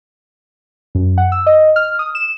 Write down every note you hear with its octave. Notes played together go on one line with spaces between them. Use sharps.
F#2
F#5
E6
D#5
F6
D#6
E7